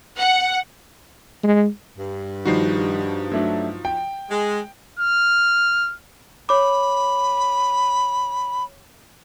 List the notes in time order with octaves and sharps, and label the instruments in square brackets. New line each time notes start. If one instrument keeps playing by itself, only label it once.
[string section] F#5
[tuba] G#3
[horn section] G2
[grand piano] D#3 G3 C7 [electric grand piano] F3 D#4 F#4
[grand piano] F#3 A3 D4
G5
[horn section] G#3
[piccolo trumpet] F6
[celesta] C#5 D6 [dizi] B5